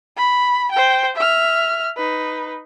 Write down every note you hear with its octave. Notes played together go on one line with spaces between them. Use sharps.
B5
C5 G5
E5 F6
D#4 B4